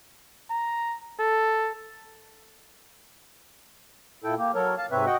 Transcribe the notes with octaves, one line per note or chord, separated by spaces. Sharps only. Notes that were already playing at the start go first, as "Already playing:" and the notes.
A#5
A4
A#2 E4 A4 G5
A#3 G4
F#3 A4 A#4 C#5
F5 A5
G#2 C3 C4 B4 C#5 E5
F#4 D#5 F#5 G5